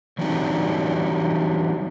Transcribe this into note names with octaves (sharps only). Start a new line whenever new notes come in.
E3 F#3 G3 C4 D4 D#4